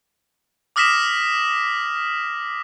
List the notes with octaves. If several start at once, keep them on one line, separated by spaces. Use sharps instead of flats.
D6 D#6 F6 A#6 B6 E7